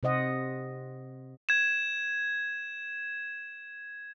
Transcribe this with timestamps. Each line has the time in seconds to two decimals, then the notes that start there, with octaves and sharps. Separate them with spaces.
0.03 C3 C5 D#5 F#5
1.49 G#6 E7